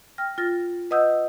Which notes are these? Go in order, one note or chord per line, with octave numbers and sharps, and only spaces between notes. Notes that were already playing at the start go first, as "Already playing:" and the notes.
G5 F6 A#6
F4 F6 A6 A#6
B4 D#5 F#5 D#6 E6 G6